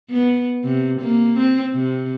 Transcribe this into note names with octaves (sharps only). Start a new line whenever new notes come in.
B3
C3
A#3
C4
C3